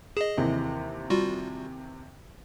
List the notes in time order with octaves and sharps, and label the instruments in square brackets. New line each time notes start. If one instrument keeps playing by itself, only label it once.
[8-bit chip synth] G#4 D#5 [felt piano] E7
[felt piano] D#2 C3 E3
[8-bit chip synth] G3 F4 F#4